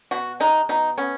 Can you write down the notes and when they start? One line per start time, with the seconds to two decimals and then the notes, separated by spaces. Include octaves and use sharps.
0.11 B2 F#4
0.40 G#3 D#4
0.69 B2 D#4
0.98 B3 C#4